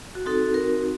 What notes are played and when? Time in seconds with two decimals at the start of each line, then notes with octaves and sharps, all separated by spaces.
0.15 F#4
0.26 C4 D#4 F#4 A4
0.54 A#4